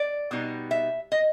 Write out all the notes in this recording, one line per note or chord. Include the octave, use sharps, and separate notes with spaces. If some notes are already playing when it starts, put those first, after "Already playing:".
Already playing: D5
B2 G3 B3 D#4
E5
D#5